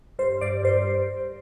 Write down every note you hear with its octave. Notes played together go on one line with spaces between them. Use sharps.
G2 C5
G2 D5
G2 C5